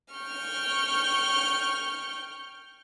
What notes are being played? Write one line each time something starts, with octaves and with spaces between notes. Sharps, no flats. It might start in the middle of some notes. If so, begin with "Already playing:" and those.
G5 C#6 F6